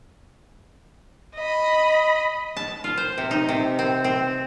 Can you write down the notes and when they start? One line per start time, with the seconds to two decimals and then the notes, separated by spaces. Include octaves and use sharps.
1.36 D#5 B5
2.57 A5
2.84 F4
2.98 C5
3.18 C3
3.31 D#4
3.49 C3
3.79 C4
4.04 C4